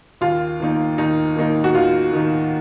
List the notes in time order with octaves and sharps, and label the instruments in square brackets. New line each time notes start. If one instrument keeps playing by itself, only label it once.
[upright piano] D#2 F4
D#3 A#3 D#4
D#2 D#4
D#3 A#3 D#4
F#4
D#2 F4
D#3 A#3 D#4